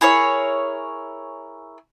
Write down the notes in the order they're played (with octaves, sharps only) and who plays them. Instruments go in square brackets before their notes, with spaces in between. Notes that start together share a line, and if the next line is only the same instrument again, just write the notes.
[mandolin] E4 G#4 A#4 C#5